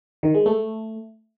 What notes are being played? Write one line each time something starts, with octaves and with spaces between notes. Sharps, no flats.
D#3
G#3
A3